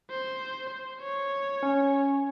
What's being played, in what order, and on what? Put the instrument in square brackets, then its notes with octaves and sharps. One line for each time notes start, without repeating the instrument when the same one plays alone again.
[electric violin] C5
C#5
[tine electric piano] C#4